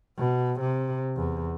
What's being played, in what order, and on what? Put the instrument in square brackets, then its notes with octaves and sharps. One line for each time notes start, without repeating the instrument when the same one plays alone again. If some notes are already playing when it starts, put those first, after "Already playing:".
[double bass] B2
C3
E2